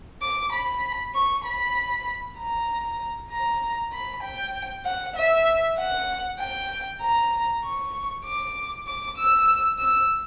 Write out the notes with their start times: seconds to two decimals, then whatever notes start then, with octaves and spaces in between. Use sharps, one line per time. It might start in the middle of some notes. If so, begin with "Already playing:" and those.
0.22 D6
0.52 B5
1.14 C#6
1.45 B5
2.38 A#5
3.30 A#5
3.92 B5
4.23 G5
4.85 F#5
5.16 E5
5.77 F#5
6.40 G5
7.01 A#5
7.63 C#6
8.25 D6
8.87 D6
9.18 E6
9.78 E6